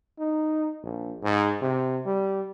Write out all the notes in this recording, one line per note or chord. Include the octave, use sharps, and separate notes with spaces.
D#4
A#1
G#2
C3
G3